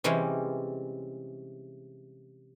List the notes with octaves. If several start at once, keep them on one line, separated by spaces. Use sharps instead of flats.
C3 E3 G3 G#3 C#4